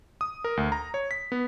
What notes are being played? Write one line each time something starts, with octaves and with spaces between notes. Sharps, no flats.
D#6
A#4
D2
A#5
C#5
B6
B3